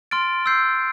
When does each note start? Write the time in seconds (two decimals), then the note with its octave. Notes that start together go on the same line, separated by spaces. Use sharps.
0.11 C6 F6 A6 D7
0.46 E6 G6 C7